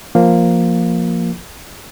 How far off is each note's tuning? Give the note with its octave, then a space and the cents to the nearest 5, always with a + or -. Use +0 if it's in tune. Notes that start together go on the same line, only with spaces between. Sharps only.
F3 +0 A#3 +0